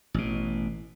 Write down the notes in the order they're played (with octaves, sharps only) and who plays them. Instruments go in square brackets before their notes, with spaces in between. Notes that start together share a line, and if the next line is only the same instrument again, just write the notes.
[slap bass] A1 B2